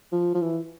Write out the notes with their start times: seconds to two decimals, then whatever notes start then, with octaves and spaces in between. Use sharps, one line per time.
0.12 F3
0.34 F3
0.42 E3